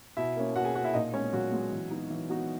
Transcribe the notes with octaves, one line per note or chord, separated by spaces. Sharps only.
B2 E4 E5
A#3 C#4
B2 F#4 F#5
G#4 G#5
A#3 C#4 F#4 F#5
E4 E5
A#2 D#4 D#5
G#3 B3 C#4 C#5
A#2 F#3 F#4
G#3 B3
E3
B3 D#4 F#4
E3
B3 D#4 F#4